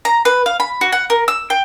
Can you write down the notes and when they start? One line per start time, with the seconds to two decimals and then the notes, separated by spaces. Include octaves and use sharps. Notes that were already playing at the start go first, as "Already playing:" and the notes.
0.05 A#5
0.25 B4
0.46 F5
0.60 B5
0.81 F#4
0.92 F#5
1.10 A#4
1.28 E6
1.50 G5